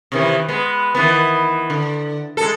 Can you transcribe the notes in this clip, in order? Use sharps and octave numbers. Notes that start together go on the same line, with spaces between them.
C3 D#3 E3
G#3 B3
D#3 E3 B3
D3
G#3 A4